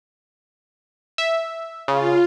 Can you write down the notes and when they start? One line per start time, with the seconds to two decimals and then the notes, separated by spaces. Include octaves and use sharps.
1.18 E5
1.88 C#3 F4